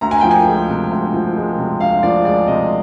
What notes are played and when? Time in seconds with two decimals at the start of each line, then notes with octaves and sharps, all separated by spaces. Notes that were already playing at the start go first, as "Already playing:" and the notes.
0.01 D2 A#5
0.11 G#5
0.21 F3 G5
0.31 G#5
0.47 G#3
0.69 C3
0.91 D2
1.14 F3
1.36 G#3
1.58 C3
1.80 D2 F5
2.03 F3 D5
2.25 G#3 D5
2.47 C3 D#5